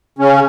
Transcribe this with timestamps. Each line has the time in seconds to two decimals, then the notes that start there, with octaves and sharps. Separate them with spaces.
0.19 C#3 C#4